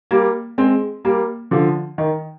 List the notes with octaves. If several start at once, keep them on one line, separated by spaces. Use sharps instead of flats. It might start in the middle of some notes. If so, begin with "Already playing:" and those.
G3 A#3
G#3 C4
G3 A#3
D3 F3
D#3